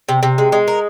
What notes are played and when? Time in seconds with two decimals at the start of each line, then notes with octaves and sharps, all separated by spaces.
0.09 C3
0.23 C3
0.38 G#3
0.52 G#3
0.68 A#4